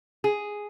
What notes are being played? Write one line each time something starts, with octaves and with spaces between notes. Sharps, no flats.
G#4